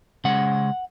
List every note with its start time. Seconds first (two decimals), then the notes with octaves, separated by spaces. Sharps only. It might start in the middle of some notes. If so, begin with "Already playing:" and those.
0.24 C#3 G#3 C#4 F#5